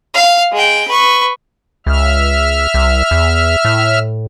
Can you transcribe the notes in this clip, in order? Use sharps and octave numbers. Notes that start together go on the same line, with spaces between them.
F5
G#3 G5
B4 C#6
C#2 E5 F6
C2
E2
A2